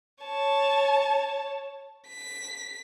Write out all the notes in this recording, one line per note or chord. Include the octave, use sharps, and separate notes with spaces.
C#5 A5
B6